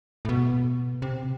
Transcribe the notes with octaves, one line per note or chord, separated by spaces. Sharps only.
A2
B2
C3